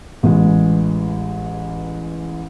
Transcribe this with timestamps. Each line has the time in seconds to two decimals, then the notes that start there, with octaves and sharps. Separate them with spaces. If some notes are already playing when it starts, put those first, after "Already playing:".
0.23 A1 E3 G#3